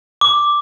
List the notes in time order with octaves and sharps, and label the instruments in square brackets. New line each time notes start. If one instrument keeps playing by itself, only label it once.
[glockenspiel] D6